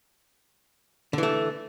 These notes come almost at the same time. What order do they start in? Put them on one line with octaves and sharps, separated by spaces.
D3 E3 A3